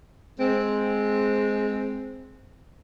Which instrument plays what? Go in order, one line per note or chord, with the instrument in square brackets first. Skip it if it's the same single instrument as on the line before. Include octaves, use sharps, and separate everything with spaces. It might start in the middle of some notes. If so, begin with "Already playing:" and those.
[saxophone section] G#3 C4